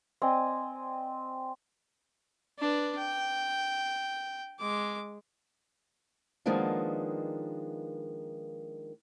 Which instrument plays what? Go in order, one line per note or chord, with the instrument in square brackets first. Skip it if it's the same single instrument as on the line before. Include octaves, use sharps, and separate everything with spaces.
[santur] C4 D5 D#5 G#5
[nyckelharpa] D4 B4
G5
G#3 D6
[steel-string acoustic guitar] D#3 F3 G#3 A#3 B3 D4